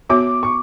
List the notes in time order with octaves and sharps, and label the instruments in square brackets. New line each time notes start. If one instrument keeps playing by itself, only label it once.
[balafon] B3 F#4 C#5 E5 [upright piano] D6
[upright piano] C#6